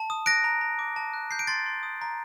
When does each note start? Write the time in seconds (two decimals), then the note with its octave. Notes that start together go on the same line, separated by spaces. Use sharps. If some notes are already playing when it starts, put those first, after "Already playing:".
Already playing: A5
0.10 D#6
0.26 F#6 A#6 D7
0.44 A#5
0.61 A#5
0.79 D6
0.96 A5
1.14 F#6
1.31 G6 C7
1.39 D7
1.47 C6 A6 C7
1.66 C6
1.83 D#6
2.02 A#5